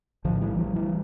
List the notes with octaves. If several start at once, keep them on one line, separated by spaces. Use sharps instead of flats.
A#1 A2 D3 F3
E3 G3
E3 G3
E3 G3